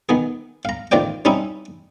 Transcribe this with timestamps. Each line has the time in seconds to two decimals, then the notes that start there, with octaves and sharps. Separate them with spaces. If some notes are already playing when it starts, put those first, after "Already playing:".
0.09 D#3 B3 G#4
0.65 F5 A#5
0.92 A1 D#3 F4 C5 D5 G5
1.25 G3 C4 C#4 D#4 E4